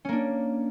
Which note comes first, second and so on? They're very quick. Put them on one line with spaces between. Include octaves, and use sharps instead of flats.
C#4 A#3 D4